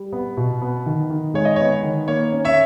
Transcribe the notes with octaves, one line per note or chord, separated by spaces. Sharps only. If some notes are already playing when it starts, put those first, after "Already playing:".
Already playing: G3
B3
B2
B3
D#3
D#3
G#3 C#5
D#5
B3 C#5
D#3
A#3 C#5
C#4
C#5 E5